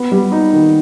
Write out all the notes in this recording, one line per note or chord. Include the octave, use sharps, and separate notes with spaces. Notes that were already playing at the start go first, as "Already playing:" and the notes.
Already playing: B3
G3
D#4
D#3